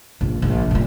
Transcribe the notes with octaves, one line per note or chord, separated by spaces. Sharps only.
A#1
A#1
A#2 G3